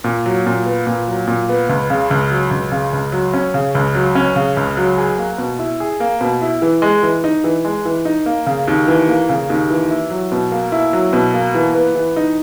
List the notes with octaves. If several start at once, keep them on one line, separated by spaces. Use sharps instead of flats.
A#2
F#3
A#2
B3
A#2
F#3
A#2
B3
C#2
C#3
C#2
F#3
C#2
C#3
C#2
F#3
C#4
C#3
C#2
F#3
C#4
C#3
C#2
F#3
G#4
A#3
B2
E4
G#4
A#3
B2
E4
E3
G#3
E3
D#4
E3
G#3
E3
D#4
A#3
C#3
D#2
E3
A#3
C#3
D#2
E3
E4
F#3
B2
A#3
E4
F#3
B2
A#3
E3
B3
E3
D#4